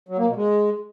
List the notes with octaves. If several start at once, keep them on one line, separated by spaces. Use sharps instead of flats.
F#3
A#3
B2
G#3